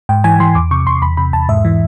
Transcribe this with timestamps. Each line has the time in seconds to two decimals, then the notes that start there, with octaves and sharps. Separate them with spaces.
0.09 G#2 G5
0.24 E3 G#5
0.40 E3 C6
0.55 E2 D6
0.71 C3 C#6
0.87 E2 C6
1.02 E2 B5
1.17 C3 B5
1.33 E2 A5
1.49 G#2 E5
1.65 E3